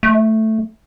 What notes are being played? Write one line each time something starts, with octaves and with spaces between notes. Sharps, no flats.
A3